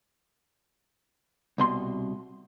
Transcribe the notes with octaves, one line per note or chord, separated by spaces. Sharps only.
C2 B2 C6